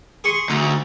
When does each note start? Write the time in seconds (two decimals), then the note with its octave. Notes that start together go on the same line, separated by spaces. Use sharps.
0.24 G#4 C6 C#6
0.50 D2 D#4